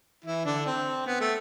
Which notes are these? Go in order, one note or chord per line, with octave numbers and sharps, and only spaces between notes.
E3 E4
D3 D4
C4
B3
A3